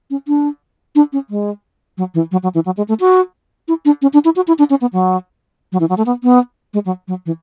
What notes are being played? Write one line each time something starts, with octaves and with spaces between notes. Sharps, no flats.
C#4
D4
D4
C#4
G#3
F#3
E3
F#3
F#3
E3
F#3
G#3
A3
F#4
E4
D4
C#4
D4
E4
F#4
E4
D4
C#4
B3
F#3
F#3
E3
F#3
A3
B3
B3
G#3
F#3
F#3
E3